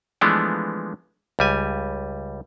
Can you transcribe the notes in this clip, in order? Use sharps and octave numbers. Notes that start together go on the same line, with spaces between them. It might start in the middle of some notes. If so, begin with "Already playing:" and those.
E3 F3 G#3 A3 B3 D4
C#2 G3 G#5